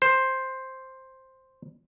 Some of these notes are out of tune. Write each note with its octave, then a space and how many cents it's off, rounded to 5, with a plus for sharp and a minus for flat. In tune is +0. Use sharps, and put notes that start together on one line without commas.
C5 +5